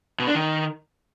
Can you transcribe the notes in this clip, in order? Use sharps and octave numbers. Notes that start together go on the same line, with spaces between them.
B2
D4
D#3